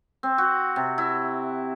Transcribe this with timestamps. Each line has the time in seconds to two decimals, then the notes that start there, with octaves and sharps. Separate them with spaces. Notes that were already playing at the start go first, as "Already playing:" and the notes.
0.23 C4
0.38 F#4
0.76 C3
0.98 E4